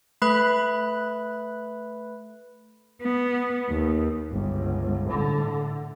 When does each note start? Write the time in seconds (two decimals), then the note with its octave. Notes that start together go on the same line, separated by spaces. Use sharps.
0.22 A3 B4 B5 F#6
3.01 B3
3.69 D#2
4.32 G1 C#2
5.11 A2 D3